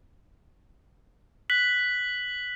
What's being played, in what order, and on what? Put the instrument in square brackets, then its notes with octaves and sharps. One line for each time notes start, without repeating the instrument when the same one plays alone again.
[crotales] F#6 B6 F#7